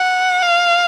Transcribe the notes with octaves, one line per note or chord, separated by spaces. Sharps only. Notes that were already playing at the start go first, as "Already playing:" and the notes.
Already playing: F#5
F5